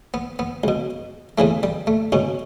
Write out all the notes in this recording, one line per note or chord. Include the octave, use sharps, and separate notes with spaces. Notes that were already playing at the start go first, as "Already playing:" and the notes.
B3
B3
C#2 B2
E2 C#3 E3 A3
G3
A3
C#2 B2 C#4